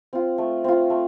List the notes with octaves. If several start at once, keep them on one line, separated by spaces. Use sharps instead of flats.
C4 F4
A3
C4 F4
A3